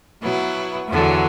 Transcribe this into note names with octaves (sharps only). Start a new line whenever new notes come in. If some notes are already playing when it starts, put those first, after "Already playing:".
B2 F#3 B3 E4
E2 D3 F#3